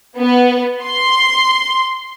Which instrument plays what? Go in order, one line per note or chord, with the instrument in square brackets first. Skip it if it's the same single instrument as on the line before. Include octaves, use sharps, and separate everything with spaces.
[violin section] B3
C6